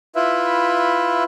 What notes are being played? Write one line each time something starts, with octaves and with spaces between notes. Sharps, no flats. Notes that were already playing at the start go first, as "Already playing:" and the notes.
E4 F4 B4 E5